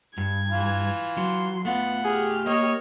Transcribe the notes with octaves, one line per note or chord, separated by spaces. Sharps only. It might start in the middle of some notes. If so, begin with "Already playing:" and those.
G2 G#6
E3 F4
F#3 C6
A3 B3 F4 F#5
G4 G#4 F6
A#3 C#5 D#5